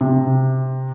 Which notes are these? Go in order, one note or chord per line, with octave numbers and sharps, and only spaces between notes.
C3